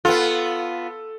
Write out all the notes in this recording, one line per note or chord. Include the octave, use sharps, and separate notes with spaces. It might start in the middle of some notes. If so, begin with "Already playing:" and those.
B3 F4 A4